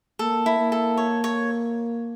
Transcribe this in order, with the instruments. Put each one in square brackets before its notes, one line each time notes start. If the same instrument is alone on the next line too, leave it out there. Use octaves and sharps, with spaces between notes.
[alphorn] A#3 [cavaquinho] A4
[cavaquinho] E4
[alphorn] A#3
[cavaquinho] A4
C#5
C#5